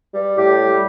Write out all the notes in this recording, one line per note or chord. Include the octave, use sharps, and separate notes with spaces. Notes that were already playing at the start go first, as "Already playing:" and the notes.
G3
A2 G4
G3